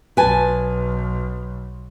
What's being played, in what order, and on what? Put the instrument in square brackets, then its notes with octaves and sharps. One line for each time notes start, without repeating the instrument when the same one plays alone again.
[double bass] B1 [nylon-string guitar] B4 G#5 A5